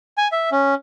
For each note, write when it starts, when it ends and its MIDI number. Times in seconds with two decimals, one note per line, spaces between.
0.18 0.28 80
0.32 0.50 76
0.52 0.74 61